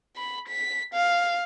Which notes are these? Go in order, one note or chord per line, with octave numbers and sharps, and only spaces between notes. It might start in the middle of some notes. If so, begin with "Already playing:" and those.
B5
B6
F5